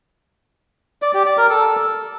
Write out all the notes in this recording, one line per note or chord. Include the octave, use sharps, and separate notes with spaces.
D5
G4
D5
A#4
A4